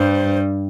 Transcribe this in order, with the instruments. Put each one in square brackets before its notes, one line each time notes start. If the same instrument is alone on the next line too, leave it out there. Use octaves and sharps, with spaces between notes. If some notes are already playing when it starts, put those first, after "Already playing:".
Already playing: [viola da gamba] G2 G3 [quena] C5